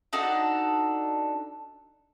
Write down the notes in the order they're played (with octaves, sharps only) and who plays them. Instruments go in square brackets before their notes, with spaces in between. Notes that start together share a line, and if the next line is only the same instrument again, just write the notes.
[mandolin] D4 D#4 F#4 A4